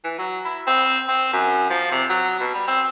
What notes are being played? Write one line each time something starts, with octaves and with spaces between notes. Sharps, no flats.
E3
F#3
E4
C4
C4
F#2
F3
C3
F#3
B2
G3
C4